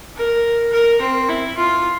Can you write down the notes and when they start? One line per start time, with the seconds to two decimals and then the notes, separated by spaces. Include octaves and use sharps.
0.16 A#4
0.72 A#4
1.02 C4
1.29 E4
1.58 F4